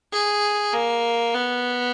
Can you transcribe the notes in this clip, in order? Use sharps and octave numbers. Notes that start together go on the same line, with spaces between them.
G#4
A#3
B3